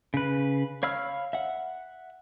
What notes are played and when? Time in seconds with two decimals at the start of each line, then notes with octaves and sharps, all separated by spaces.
0.14 C#3 B4
0.83 C#5 F5 B5 E6 F6
1.33 E5 F#5